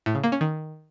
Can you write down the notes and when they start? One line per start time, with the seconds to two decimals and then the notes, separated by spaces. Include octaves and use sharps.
0.06 A2
0.15 C#3
0.24 A#3
0.32 C#4
0.41 D#3